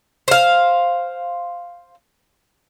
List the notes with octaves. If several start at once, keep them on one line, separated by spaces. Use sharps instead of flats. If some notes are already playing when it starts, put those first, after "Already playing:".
C5 F5